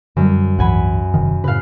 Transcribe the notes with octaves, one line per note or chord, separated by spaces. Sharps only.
F#2 D3 G3
C2 G#2 E3 F#5 G#5 B5
E1 C3 D#3
A2 C#3 B4 F5